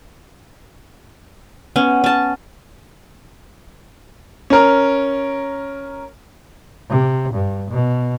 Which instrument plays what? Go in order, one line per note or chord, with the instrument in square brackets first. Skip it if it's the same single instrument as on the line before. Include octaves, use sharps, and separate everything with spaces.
[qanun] B3 C#4
C#4 A5
[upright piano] C#4 A#4
[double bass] C3
G2
B2